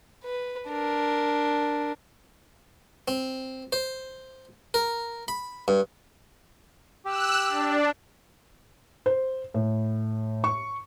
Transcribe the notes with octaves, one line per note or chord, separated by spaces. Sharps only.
B4
D4 A#4
C4
C5
A#4
B5
G2
G4 E6 F#6
D4
C5
A2
C#6